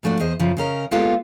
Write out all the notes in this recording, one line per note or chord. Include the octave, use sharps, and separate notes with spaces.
G#2 F3 A3 D4 F#4
E2 G#4 C5 D#5
F#2 C#3 F3
C#3 C#4 A#4 D#5
G#3 A#3 B3 F4 G4 A4